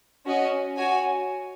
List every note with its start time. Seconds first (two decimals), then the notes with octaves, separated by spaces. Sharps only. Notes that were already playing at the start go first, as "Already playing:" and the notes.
0.26 C#4 F#4 D#5
0.77 F#4 C#5 G#5